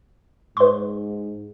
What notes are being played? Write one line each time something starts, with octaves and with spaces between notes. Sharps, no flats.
G#2 B4 C6